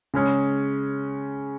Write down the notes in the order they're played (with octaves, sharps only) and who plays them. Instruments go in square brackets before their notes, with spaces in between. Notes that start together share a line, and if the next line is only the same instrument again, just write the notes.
[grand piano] C#3 G#3 C#4